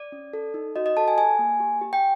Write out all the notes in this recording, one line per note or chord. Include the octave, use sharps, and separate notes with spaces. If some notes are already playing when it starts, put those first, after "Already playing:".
Already playing: D5
C#4
A4
D#4
F#4 D#5
D#5
A4 A5
G#5
G4 G#5
A#3
G4
G4
G5